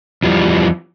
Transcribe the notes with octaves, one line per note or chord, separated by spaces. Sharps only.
E2 E3 F3 G3